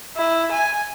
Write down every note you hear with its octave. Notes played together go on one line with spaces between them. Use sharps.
E4
G#5